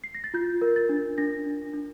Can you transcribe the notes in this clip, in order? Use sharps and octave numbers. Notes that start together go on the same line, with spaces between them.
C7
A#6
A6
F4 G6
A#4
A6
D4
D4 A#6
D4
D4